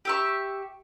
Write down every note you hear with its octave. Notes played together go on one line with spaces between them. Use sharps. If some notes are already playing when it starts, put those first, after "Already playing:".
G4 E5 C#6